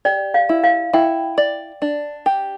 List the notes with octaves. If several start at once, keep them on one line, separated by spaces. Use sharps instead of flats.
G4 D5
F5
E4
F5
E4 G5
D5
D4
G4